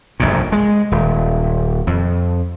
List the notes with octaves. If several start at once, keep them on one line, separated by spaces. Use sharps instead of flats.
F1 A#1 G2 A#2
G#3
D#1
F2